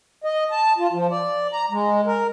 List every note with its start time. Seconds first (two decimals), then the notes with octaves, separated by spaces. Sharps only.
0.24 D#5
0.51 A5
0.78 F4
0.93 F3
1.11 D5
1.52 A#5
1.71 G#3
2.06 A#4